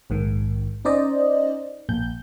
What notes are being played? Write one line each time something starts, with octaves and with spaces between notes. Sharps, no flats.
A#1 G#2 D#3
C#4 D#4 C5 D5 D#5
A#1 G6